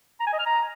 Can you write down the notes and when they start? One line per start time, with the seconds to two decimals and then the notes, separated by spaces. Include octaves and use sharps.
0.20 A#5
0.27 G#5
0.33 D#5
0.40 F6
0.46 A#5